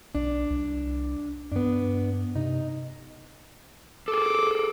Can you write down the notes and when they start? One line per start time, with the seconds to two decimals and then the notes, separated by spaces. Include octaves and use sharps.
0.15 B1 D4
0.50 C2
1.52 G2 B3 D4
2.36 C3 D#4
4.08 G#4 A4 D6